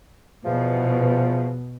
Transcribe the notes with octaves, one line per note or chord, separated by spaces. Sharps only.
E2 B2 F3